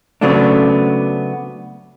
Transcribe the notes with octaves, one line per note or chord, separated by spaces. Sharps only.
C#3 F#3 A3 B3 C4 D4